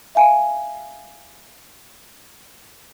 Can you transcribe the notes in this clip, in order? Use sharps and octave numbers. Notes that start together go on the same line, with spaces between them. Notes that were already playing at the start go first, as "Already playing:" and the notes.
E5 F5 G#5